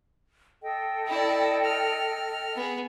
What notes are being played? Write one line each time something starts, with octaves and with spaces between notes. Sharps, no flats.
A4 D#5 G5
E4 D5
F6
B3 G#4